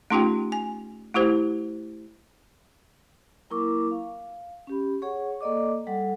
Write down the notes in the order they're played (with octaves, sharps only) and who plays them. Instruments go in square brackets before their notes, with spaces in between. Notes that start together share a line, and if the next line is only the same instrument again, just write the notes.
[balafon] A3 C#4 D#4 F4 G4 G5
G#5
A3 E4 G4 C5
[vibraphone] F#3 A#3 E4 A#4 C#6 D6
F5
C#4 G4 B5
G#4 C#5 F#5 C#6
A#3 A4 D5 D#5 D6
G3 A4 F#5